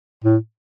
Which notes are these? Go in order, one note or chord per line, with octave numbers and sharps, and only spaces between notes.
A2